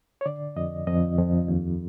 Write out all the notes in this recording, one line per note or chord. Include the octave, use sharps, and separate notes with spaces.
C#5
D3 D5
F2 D#5
F2 D#5
F2
D#2